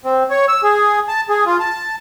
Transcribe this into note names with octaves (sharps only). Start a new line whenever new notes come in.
C4
C#5
E6
G#4
A5
G#4
F4
A5